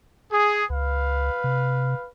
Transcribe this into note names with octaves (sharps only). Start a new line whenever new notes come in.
G#4
C#2 B4 F5
C3